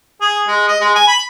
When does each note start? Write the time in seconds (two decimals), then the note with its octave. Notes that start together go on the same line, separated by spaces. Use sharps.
0.21 G#4
0.47 G#3
0.68 D#5
0.81 G#3
0.95 G#5
1.08 B5